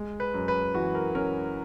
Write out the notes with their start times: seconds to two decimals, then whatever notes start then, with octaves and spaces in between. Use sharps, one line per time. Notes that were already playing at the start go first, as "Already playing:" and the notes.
Already playing: G#3
0.20 B4
0.34 F#2
0.48 B4
0.75 E3 F#4
0.95 A#4
1.15 C#4 A#4